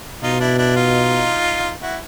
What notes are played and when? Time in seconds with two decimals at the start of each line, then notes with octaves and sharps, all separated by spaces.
0.23 B2 D#4 F4
0.40 D4 E4
0.58 D4 E4
0.76 D#4 F4
1.82 E4 F#4